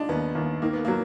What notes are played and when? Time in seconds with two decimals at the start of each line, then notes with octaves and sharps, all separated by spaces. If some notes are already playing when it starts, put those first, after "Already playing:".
Already playing: G#3 D4 D#4 F4
0.09 D#2 B3
0.35 D#2
0.62 D#3 A#3
0.73 B3
0.85 F#3 A#3